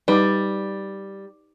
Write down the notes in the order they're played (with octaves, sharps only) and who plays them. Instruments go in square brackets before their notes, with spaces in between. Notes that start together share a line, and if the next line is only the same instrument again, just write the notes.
[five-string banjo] G3 [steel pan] D#4 B4 D5